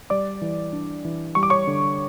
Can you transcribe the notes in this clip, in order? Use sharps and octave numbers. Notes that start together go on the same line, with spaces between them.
G3 D5 D6
E3
D4
E3
G3 C#6
D6
C#5 C#6
D3